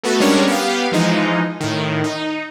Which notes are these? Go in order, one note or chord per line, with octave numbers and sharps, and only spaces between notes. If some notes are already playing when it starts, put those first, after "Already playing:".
A3 B3 F#4 A4
G3 G#3 C#4 D4 A#4 C#5
B3 G4 F5
E3 F3 G#3 D#4
A2 D#3
D#4